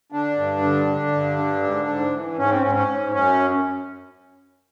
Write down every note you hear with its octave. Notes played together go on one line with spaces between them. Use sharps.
D3 D4
G2
D3
D3
G2
D3
G#2
G#2
E3
G#2 C#4
C4
G#2 C#4
C#4
G#2
F#2 C#4